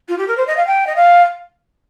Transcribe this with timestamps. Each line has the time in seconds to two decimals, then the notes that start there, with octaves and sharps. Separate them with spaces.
0.08 F4
0.18 G4
0.27 A#4
0.37 C5
0.47 D#5
0.56 F5
0.67 G5
0.86 D#5
0.96 F5